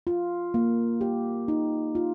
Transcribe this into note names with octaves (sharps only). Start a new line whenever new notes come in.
F4
A#3
G4
D#4
F4